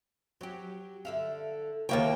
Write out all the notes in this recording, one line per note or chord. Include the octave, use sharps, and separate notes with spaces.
F#3 G4
D3 E5 F5
D#2 D#3 A#3 E4 C#5 G5